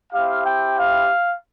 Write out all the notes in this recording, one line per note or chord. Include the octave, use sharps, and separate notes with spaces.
C4 E4 G4 F5
G5
F5